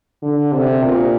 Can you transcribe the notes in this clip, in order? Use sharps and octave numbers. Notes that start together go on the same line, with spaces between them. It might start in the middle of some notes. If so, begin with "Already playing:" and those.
D3
C3
A#2